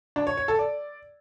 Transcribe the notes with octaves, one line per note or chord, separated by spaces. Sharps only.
D4
C#5
C#5
A4
D5